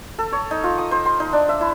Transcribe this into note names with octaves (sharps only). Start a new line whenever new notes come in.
A4
C#5
D#4
F4
D#6
C5
C6
D#4
D4
E5
E4